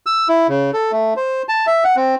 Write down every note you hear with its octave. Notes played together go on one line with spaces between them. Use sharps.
E6
E4
C#3
A4
A3
C5
A5
E5
F#5
C4